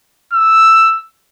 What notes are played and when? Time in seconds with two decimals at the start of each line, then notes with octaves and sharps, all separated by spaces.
0.33 E6